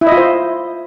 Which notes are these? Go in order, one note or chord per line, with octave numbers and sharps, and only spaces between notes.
E4
D#5
F4
C5